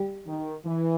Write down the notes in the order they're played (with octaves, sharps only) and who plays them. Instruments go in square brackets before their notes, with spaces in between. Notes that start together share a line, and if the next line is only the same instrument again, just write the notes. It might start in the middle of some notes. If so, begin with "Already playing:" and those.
Already playing: [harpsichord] G3
[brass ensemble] D#3
E3